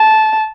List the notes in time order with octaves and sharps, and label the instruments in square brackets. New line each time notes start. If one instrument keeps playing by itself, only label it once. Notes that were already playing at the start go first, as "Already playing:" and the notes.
Already playing: [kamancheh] A5